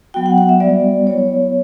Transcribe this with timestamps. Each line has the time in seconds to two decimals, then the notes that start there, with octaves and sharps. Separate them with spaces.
0.14 F#3 B3 F#4 G5
0.26 F#5
0.38 F#5
0.49 E5
0.60 G3 B3 F#4 D5
1.07 F#3 B3 E4 C#5